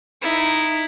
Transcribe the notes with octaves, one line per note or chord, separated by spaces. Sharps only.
D#4 E4